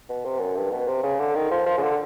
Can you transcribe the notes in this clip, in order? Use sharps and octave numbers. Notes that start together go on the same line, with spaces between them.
B2
C3
F#2
G2
B2
C3
C#3
D3
D#3
F3
F3
C#3
D3